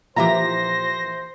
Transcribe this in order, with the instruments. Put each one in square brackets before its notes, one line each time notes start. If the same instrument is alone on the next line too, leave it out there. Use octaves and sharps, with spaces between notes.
[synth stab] A#2 E3 F3 [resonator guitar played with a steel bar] G4 E5 A#5 [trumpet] C5 [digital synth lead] A#6